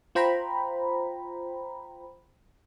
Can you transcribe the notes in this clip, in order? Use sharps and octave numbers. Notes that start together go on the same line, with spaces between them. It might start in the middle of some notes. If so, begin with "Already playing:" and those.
F4 C5 G5 A#5 B5